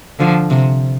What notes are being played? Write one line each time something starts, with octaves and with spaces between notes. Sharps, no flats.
D3 F3
C3